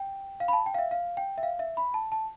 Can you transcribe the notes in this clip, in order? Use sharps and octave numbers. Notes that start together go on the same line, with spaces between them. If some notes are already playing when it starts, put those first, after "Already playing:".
Already playing: G5
F5
B5
A5
G5
F5
E5
F5
G5
E5
F5
E5
B5
A5
A5